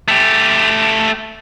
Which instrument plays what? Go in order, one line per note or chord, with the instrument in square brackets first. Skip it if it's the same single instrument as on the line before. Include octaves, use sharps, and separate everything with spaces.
[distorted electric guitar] A3 G4